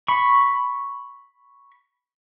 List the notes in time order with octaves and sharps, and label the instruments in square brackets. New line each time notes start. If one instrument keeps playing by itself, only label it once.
[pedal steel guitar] B5 C#6